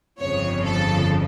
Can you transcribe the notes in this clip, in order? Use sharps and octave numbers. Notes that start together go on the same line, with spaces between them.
G1 F2 C#3 F3 C#5
A4